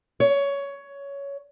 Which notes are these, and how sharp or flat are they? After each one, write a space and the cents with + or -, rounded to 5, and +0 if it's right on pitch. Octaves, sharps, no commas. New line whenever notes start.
C#5 +15